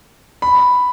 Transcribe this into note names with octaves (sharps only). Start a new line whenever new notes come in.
B5